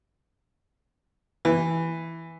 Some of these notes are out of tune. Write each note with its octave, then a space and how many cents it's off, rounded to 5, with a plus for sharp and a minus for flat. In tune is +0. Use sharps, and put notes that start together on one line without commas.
E3 +0